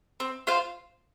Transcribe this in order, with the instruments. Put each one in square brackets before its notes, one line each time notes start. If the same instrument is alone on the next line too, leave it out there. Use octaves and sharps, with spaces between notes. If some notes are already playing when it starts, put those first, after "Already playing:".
[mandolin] C4
F4 C5 F5